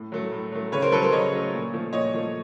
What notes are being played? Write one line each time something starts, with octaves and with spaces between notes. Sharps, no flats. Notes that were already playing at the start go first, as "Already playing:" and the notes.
Already playing: A2
F#3 A3
A2
F#3 A3
C#3 B4 C#5
A#4 C5
F#3 A3 A4 B4
A#4 C5
C#3 C#5 D#5
F#3 A3
A#2
F3 A3
A#2 C#5 D#5
F3 A3